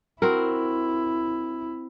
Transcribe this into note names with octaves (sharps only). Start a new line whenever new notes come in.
C4 E4 F#4 A#4